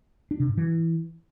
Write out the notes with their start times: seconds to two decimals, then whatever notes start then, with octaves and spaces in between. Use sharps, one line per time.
0.31 D4
0.40 C3
0.49 G#2
0.57 E3